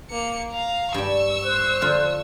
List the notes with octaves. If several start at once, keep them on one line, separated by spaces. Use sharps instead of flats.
A#3 C#7
F5 A#5
G2 G3 C#6 E6
C5 F#6
F2 D3 F4